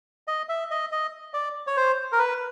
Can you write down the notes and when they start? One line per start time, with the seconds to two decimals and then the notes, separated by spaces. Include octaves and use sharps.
0.28 D#5
0.49 E5
0.71 D#5
0.92 D#5
1.34 D5
1.67 C#5
1.77 C5
2.12 A#4
2.19 B4